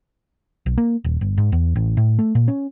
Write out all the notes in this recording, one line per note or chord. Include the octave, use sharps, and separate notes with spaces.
B1
A#3
D#1
G1
G#2
E2
A1
A2
A3
A#2
C#4